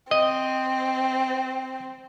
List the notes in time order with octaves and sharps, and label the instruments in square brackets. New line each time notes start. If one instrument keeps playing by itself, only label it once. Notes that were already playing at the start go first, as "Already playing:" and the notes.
[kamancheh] C4 [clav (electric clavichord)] D#5